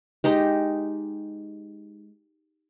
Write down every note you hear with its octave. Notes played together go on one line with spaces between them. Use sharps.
G#3 D#4 G4 D#5